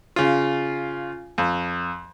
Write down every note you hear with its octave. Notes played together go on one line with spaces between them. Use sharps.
C#3 F4
F2